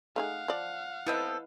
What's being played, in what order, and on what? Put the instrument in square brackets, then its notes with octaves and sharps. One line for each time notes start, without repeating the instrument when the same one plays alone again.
[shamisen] A3 D#4 G#4 [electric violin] F5 F#5
[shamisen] F3 D5
[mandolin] B3 C4 A4 [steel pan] E4 B4 D#5